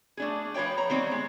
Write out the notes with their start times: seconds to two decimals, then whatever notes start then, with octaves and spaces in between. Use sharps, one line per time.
0.17 A3 D4 G#4
0.54 F3 B4 C#5 D5 G5
0.77 C#5 A#5
0.90 D#3 G3 B3 C4
1.11 G#3